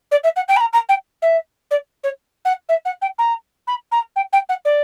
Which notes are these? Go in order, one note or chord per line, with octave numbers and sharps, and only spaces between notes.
D5
E5
F#5
G5
B5
A#5
A#5
G5
E5
D5
C#5
F#5
E5
F#5
G5
A#5
B5
A#5
G5
G5
F#5
D5